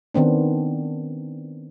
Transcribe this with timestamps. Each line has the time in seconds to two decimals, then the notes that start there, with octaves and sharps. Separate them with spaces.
0.14 D#3 B3 C4 D4